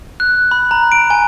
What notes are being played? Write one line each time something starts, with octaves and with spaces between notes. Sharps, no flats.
F#6
B5
A#5
D7
G#5